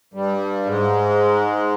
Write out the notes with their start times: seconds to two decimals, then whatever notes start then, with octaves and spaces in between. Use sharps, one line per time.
0.14 G2 G3
0.65 G#2 G#3